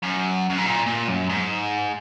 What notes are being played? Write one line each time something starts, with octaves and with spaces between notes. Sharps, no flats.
F#2
F#2
G#2
A#2
A#2
F#2
G#2